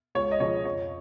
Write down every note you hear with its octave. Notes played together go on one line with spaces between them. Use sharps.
C#2 C#5
D#5
C#3 F3 C#4 C#5
F2 C#5